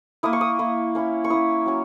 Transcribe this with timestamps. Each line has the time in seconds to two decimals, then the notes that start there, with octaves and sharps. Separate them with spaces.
0.23 A#3 E4 D#6
0.33 C#6
0.41 D#6
0.59 A#3 E4
0.95 A#3 C#4 E4
1.24 C#6
1.30 A#3 C#4 E4 D#6
1.66 F#3 C#4